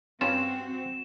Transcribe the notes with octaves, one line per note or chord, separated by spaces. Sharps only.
G2 C4 C#4 F4 F#4 E7